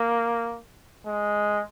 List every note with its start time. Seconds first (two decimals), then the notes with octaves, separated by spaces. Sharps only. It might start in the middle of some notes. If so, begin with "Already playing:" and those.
Already playing: A#3
1.07 G#3